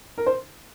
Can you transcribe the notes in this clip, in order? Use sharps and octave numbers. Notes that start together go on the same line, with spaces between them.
A#4
C5